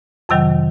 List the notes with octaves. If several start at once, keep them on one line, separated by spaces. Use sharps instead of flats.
F2 C3 D#3 F#3 G5